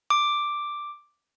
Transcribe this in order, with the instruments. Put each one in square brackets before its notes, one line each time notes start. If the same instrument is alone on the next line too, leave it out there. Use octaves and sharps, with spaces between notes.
[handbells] D6